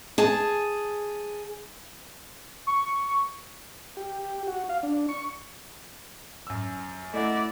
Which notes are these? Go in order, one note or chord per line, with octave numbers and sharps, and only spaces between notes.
G#4 A5
C#6
G4
F#4
F5
D4
C#6
F#2 E6
A3 E4 D5 D#5 F#5